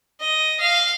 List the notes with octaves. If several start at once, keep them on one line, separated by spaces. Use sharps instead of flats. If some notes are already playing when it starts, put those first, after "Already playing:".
D#5
F5